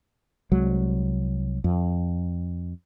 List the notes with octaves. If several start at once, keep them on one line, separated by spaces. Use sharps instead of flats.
C2 F#3 G#3
F2